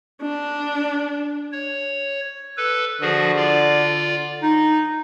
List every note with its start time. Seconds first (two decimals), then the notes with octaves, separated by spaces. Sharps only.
0.22 D4
1.52 C#5
2.57 A4 B4
3.02 D3 F3 F#4 G#4
3.36 F4 D5
4.42 D#4